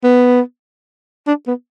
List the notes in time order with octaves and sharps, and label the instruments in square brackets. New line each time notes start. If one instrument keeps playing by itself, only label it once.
[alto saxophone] B3
D4
B3